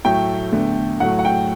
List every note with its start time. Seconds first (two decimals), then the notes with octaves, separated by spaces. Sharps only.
0.05 A2 F#3 A3 G5
0.52 E2 D3 A3
1.00 A2 F#3 A3 F#5
1.19 F#5
1.25 G5